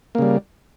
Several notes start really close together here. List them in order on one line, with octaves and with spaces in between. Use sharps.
A#3 C#3 G3